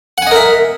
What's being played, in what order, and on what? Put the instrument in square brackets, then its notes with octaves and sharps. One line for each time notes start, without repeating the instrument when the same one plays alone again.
[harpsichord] F#5
G#5
D#5
A#4
E5